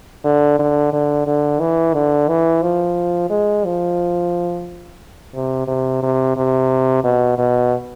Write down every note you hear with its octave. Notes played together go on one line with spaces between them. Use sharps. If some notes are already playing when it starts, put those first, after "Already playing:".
D3
D3
D3
D3
E3
D3
E3
F3
G#3
F3
C3
C3
C3
C3
B2
B2